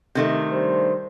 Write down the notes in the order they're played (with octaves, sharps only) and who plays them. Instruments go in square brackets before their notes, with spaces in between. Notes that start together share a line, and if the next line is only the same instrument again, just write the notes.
[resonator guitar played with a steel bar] C3 D#3 A3
[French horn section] G3 D4 C5